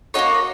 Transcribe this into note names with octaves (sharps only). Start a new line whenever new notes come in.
A#3 D#4 F#4 C#5 D#5